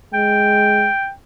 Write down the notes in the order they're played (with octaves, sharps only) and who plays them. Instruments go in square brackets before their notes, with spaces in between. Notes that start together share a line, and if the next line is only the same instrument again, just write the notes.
[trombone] G#3 [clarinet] G5